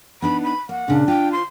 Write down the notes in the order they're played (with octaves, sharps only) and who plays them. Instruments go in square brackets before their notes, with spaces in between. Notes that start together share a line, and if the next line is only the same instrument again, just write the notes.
[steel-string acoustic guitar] B3 D4 D#4 [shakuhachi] B5
[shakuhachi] B5
[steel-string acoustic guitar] A#3 [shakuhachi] F#5
[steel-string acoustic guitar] A#2 C#3 [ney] D4
[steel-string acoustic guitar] F4 [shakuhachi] G5
[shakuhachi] C6